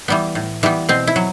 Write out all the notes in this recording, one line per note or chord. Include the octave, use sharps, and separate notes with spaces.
E3 G3 B3
A2
E3 G3 B3
B2 C4
E4
F#3